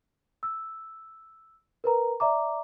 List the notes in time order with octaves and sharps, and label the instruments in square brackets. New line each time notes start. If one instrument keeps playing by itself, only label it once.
[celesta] E6
A#4 B4 A#5
D5 E5 A#5 D6